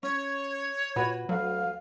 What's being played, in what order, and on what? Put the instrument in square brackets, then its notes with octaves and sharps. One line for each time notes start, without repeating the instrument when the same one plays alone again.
[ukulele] C#4 [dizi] C#5
[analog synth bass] A#2 [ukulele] F#4 B4
[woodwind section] D2 F5 [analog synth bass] F#3